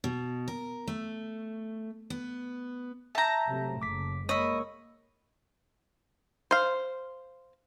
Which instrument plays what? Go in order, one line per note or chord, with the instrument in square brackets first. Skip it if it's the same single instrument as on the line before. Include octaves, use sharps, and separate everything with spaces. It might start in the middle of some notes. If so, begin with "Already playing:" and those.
[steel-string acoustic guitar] B2
A#4
A3
B3
[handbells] E5 G6 [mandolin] A5 A#5
[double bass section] C3 F#3 A3
[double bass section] F#1 C#3 [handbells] D6 B6
[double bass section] G#3 A#3 [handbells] C#5 C#6 E6 [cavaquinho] D#5 B5
[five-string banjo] C5 F5